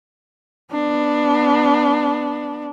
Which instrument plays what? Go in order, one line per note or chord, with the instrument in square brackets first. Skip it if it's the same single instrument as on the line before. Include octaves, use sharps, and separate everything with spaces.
[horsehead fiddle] B3 D4